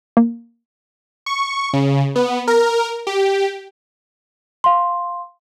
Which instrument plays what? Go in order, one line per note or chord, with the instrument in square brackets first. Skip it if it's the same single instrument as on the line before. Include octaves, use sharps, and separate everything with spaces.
[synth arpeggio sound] A#3
[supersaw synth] C#6
C#3
B3
A#4
G4
[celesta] F5 C6